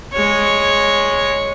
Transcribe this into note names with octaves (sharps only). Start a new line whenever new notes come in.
G#3 C#5